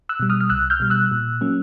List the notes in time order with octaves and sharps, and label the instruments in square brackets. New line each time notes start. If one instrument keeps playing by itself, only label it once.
[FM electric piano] E6 F#6
B2 G3
D#6 F6
F6
C2 E6 F#6
F6 G6
B2 G3
E6 F#6
A#2
F#3 A#3 C#4